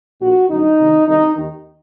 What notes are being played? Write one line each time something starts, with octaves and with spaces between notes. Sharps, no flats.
A#1 A#2 F#4
G1 F#2 D3 D#4
D2 C3 D#3
C2 C3 D#3 D#4
D#2 D#3